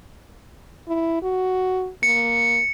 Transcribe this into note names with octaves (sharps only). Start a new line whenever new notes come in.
E4
F#4
A#3 C#7